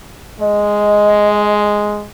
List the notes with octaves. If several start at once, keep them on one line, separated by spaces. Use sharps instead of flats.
G#3 D#5